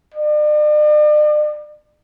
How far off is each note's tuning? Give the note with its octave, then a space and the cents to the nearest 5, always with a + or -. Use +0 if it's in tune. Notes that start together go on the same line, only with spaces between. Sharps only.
D5 +40